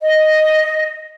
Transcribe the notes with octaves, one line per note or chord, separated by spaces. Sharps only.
D#5